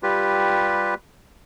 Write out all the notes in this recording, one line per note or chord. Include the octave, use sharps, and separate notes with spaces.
G3 F4 G4 B4